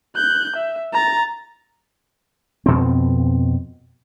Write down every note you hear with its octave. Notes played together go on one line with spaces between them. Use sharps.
F#6 G6
E5
A#5 A6
F2 B2 C4